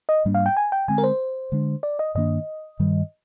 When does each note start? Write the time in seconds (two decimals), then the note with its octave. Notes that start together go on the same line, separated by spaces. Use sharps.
0.09 D#5
0.25 G#2 G3 A#3 D4
0.34 F5
0.46 G5
0.57 G#5
0.72 G5
0.88 D3 G#3 C4 G#5
0.98 A#4
1.04 C5
1.52 D3 G#3 D4
1.83 D5
1.99 D#5
2.15 G2 D#3 A#3 D4 D#5
2.79 G2 D#3 G3